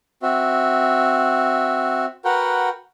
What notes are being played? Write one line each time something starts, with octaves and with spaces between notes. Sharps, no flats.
C4 F#4 E5
F#4 A#4 B4 F#5 G5